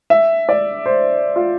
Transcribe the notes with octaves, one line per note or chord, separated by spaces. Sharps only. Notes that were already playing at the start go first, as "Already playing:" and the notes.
E5
D5
C5
F4